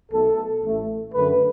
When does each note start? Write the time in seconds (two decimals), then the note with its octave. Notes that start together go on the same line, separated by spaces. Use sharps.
0.12 B1 B2 A3 A4
0.63 A1 A2 A3
1.14 F#2 D3 A3 B4